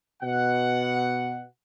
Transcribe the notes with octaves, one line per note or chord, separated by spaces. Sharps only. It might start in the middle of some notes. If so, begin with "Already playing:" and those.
B2 F#5